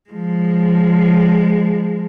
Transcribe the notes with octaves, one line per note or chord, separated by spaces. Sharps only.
F3 G#3